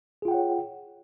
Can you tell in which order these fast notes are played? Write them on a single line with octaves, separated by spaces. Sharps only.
G#4 F4 G5 F#5 C#5